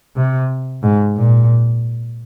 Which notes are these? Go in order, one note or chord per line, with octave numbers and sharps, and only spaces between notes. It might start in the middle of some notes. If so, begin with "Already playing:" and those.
C3
G#2
A#2